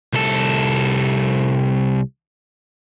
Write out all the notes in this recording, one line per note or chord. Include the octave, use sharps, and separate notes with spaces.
C2 A4